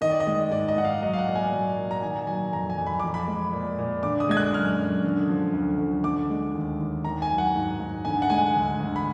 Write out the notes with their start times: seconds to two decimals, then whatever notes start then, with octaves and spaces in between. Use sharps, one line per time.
0.01 D#3 D#5
0.11 D5
0.20 D#5
0.27 G#3
0.51 G#2 D5
0.68 D#5
0.76 G#2 F#5
0.85 F5
1.02 F#3 D#5
1.13 F5
1.18 F#5
1.27 A#2
1.35 G#5
1.52 F#3
1.77 A#2
1.91 A#5
2.02 D#3 G#5
2.27 F#3 G#5
2.52 F2 A#5
2.70 G#5
2.78 F2
2.87 B5
3.00 F3 D6
3.14 B5
3.28 G#3
3.53 A#2
3.79 A#2
4.03 D3 D6
4.20 D#6
4.29 G#3 G#6
4.37 F#6
4.54 F#2 F6
4.78 F#2
5.04 D3
5.29 F3
5.54 D2
5.79 D2
6.04 D3 D6
6.30 G#3
6.55 D#2
6.80 D#2
7.04 D#3 A#5
7.22 G#5
7.30 F#3
7.38 F#5
7.56 G#2
7.80 G#2
8.05 D3 G#5
8.22 F#5
8.30 G#3 G#5
8.56 D2
8.80 D2
8.96 B5